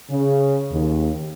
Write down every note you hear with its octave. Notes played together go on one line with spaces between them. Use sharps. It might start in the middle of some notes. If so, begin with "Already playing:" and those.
C#3
D#2